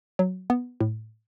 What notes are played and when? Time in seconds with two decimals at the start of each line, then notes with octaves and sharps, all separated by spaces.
0.19 F#3
0.50 B3
0.81 A2